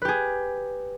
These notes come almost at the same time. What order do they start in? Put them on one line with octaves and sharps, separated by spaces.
B4 G4 G#4